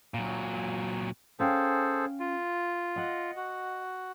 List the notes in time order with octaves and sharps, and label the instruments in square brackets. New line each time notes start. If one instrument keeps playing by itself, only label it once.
[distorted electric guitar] A#2 F#3
[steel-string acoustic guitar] C#4 F5 G5 [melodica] G#4 A4 C5
[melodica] F4
[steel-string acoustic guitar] D#5 F#5
[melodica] F#4